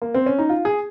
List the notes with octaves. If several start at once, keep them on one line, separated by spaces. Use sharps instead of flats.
A#3
C4
C#4
D#4
F4
G#4